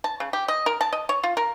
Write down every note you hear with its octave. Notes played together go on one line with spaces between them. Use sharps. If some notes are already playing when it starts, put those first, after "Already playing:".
A5
C#3
G4
D#5
A#4
A5
D#5
C#5
F4
A#4